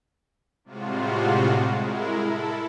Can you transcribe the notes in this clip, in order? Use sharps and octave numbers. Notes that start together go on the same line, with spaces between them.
A2 C3 G3 G#3 F4 F#4
G#3 E4 A#4
E4 A4